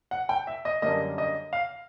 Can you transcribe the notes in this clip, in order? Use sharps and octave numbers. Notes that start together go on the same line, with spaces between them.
F#5
G5
E5
D#5
F#2 D3 G3 A#3 D4 D#5
D#5
F5